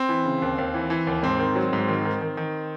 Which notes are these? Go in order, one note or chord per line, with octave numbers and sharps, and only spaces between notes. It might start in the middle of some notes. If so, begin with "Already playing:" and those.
Already playing: C4
E3
C#3
D#2
D#2
E3
E3
D#2
G#2 C4
D#3
F#3
G#2
D#3
D#3
D#3
D#3